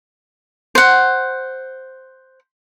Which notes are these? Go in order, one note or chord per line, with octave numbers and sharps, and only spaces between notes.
C5 F#5